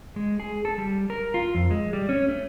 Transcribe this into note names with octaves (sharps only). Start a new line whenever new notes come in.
G#3
G#4
A4
G3
A#4
F4
F2
G#3
G3
C#4
A3